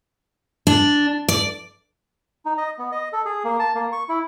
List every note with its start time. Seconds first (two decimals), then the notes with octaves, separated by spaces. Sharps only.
0.67 D4
1.28 D5
2.45 D#4
2.58 D#5
2.78 B3
2.92 D#5
3.12 A4
3.25 G#4
3.44 A#3
3.59 A5
3.75 A#3
3.92 C#6
4.09 E4